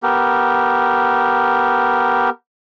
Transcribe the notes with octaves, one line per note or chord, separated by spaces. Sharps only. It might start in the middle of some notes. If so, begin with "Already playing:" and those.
B3 G4 A#4